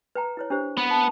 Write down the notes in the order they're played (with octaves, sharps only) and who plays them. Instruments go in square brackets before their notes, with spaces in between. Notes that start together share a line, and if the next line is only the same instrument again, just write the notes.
[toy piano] B4 G5 A#5
E4 B4 C#5
D4 G4 C5
[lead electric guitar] B3
[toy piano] A5